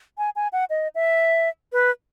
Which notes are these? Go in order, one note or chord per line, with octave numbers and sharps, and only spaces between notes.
G#5
G#5
F#5
D#5
E5
B4